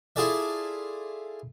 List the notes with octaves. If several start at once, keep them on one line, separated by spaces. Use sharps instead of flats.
E4 F4 G#4 A4 D5 E5